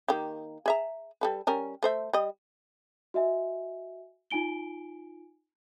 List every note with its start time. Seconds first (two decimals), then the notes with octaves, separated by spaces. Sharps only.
0.08 D#3 A#3 G4
0.66 G#4 E5 A#5
1.21 G3 A4 B4
1.47 G3 C#4 A#4
1.83 A3 C5 E5
2.13 G3 D#5
3.14 F#4 D#5 E5 G#5
4.31 D#4 F4 G#5 D7 G7